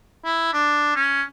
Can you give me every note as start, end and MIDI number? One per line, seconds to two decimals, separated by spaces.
0.24 0.49 64
0.53 0.92 62
0.96 1.23 61